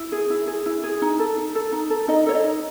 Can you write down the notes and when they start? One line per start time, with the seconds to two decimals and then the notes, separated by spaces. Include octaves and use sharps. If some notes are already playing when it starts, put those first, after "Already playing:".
Already playing: E4
0.12 G#4
0.30 E4
0.47 G#4
0.66 E4
0.83 G#4
1.02 D#4
1.19 A4
1.38 D#4
1.55 A4
1.72 D#4
1.90 A4
2.08 D#4 D#5
2.26 A4 C#5
2.35 D#5
2.44 D#4